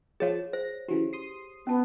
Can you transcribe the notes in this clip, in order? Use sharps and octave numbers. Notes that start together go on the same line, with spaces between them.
F3 G#4 C#5 F5 A5
C5 A#6
C#3 E3 F#3 G4
C6 D#6 C7
B3 C#4 A5